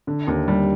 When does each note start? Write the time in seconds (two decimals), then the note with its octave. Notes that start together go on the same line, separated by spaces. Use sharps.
0.07 D3
0.27 D#2
0.48 G3